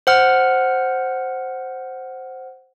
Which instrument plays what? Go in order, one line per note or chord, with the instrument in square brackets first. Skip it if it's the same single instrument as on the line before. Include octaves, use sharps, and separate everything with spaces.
[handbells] C5 F#5 F6